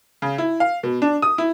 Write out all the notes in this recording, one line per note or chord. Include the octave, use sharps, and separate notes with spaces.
C#3
E4
F5
B2
D4
D#6
E4